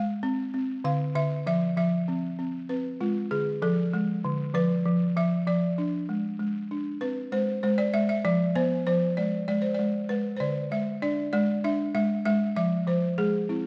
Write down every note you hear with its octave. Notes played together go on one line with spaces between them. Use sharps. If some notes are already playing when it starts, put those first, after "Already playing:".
Already playing: G#3 F5
C4
C4
D3 F5
D3 E5
F3 E5
F3 E5
C4
C4
C4 B4
G#3 F4
D3 G#4
F3 A4
G#3
D3
F3 B4
F3
F3 E5
F3 D5
D4
G#3
G#3
D4
C4 B4
G#3 C5
G#3 C5
D5
G#3 E5
E5
F3 D5
B3 C5
F3 C5
G#3 D5
G#3 D5
C5
G#3 D5
G#3 B4
C5
D3 D5
G#3 E5
D4 D5
G#3 D5
D4 E5
G#3 E5
G#3 E5
F3 E5
F3 C5
G#3 G#4
C4 E4